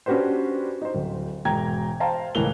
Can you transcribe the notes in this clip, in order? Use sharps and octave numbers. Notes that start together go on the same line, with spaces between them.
C#4 D4 F#4 G4 B4 C5
D#4 C5
D1
E1 G#2 G5 A#5 G#6
C5 F5 G5 A5 A#5
C#2 A2 E3 A#4 F7 G7